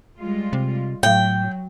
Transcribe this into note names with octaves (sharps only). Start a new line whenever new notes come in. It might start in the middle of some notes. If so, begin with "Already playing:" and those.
G3 G#3 F4
C3
A2 F#3 G5